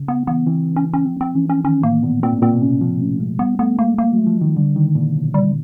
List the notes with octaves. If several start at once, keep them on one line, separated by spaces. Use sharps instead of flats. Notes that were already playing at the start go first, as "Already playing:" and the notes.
Already playing: C#3
B3
E3 B3
E3 C4
C#4
C#4
F3 C4
C4
E3 C#4
C#4
D#3 C#4
A2 A#3
A#2 B3
A#2 C4
A2
A#2 C4
B2
C3 C#4
F3 C4
A3 C#4
G#3
G3 B3
A3 B3
G#3 A#3
A#3
F#3 A3
F3
D#3 G#3
D3 G3
D#3
G#3
A#2
B2 F#3
C#3 G3